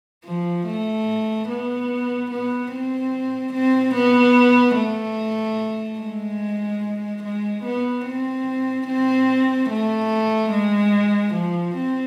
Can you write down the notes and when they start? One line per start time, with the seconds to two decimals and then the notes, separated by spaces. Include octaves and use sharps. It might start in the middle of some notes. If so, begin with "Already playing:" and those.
0.24 F3
0.66 A3
1.48 B3
2.31 B3
2.72 C4
3.53 C4
3.95 B3
4.76 A3
6.00 G#3
7.23 G#3
7.64 B3
8.06 C4
8.88 C4
9.70 A3
10.52 G#3
11.34 F3
11.75 C4